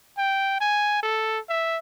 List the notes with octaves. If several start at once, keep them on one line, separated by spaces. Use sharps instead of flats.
G5
G#5
A4
E5